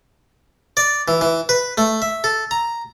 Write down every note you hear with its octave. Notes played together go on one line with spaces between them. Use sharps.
D5
E3
E3
B4
A3
E5
A4
A#5